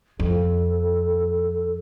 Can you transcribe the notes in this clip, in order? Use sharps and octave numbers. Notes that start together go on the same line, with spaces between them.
F2 A4